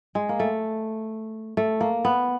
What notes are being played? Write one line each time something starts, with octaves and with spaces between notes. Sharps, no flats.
G#3
A#3
A3
A3
A#3
B3